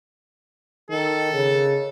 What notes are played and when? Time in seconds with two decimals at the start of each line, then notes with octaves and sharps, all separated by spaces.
0.90 D#3 A4
1.33 C#3